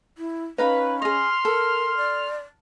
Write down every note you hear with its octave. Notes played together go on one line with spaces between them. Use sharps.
E4
C#4 D#4 B4 F5 B5
G#4 D#5 C6 F6
A4 A#4
D5